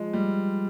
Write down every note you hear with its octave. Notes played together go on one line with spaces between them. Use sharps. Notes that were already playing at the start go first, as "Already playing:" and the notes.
Already playing: F3 G#3
G3